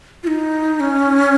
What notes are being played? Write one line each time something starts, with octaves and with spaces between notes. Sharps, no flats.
F4
D#4
C#4